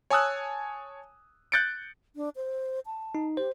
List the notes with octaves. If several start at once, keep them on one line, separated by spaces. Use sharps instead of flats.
C#5 G#5 A5 D#6 E6 F#6
F#6 G6 A6 C#7 D7
D4
C5
A5
D#4
G4 C5